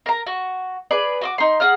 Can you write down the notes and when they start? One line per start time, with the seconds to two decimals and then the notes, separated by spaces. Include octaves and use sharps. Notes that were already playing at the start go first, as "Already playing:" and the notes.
0.06 A#4 A#5
0.26 F#4 C#6
0.91 G#4 B4 D5
1.21 F#4 C6 D6
1.38 D#4 C6
1.60 G#4 F#5 A#5 F6